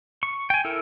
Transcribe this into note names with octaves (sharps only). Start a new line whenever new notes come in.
C#6
G5 G#5
E4 A4 A#4